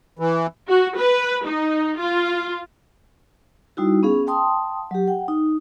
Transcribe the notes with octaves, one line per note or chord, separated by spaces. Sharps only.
E3
F#4
B4
D#4
F4
G3 D#4 E4 F#4
B3 C#4 G#4 F5
F5 G5 A5 C6 D#6
F#3 G4
F#5 G5
D#4